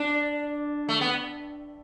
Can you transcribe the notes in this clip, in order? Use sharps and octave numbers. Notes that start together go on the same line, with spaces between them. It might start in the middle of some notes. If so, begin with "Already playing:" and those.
Already playing: D4
A3
B3